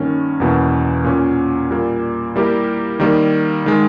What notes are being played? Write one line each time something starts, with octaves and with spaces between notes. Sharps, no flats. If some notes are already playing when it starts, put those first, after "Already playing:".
Already playing: G2 D#3 A#3 C#4
E2 B2 A#3 C#4 E4
A#2 A#3 C#4
A#2 G3 A#3
G3 A#3 E4 G4 A#4
D#3 G3 A#3
D#3 G#3